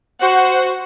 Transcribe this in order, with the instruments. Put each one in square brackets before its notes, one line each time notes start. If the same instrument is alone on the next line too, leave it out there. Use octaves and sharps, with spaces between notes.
[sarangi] F#4 [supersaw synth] C5 F#5